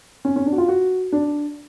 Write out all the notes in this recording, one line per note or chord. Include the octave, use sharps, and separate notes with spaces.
C#4
C#4
D4
F#4
F4
F#4
D4